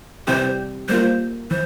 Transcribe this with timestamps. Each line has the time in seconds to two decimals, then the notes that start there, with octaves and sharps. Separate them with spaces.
0.27 C3 E3 G3 C4 G4 C5
0.89 G3 A#3 F4 C5
1.51 E3 C5